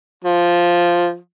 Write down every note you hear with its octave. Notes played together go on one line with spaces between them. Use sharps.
F3